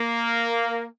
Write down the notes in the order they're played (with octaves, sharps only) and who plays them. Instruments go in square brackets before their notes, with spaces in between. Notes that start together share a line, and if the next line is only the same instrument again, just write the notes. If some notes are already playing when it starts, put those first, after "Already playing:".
Already playing: [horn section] A#3